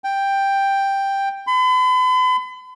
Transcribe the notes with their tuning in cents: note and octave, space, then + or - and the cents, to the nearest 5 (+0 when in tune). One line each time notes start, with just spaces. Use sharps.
G5 +5
B5 +45